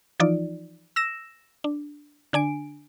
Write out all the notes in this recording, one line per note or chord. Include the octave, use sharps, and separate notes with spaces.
E3 F3 D#4 F4 D5
E6 A#6 E7
D4
D3 D4 G#5 D7